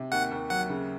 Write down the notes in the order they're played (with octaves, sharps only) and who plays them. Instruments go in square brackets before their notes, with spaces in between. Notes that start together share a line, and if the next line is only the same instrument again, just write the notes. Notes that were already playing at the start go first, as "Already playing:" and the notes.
Already playing: [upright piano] C3
[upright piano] D#2 [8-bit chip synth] F#5
[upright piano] D#2
[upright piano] F#3 [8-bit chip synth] F#5
[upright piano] C#3